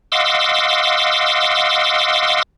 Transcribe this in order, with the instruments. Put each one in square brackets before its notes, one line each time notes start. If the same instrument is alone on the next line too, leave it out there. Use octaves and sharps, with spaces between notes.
[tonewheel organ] D#5 F5 F#5 C6 D6 E6